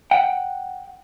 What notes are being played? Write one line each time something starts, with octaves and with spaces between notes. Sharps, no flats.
F#5 G5